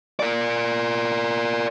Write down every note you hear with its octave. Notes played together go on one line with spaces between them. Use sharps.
A#4 D5